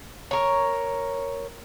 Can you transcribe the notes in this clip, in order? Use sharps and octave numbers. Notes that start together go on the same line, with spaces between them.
A#4 C#5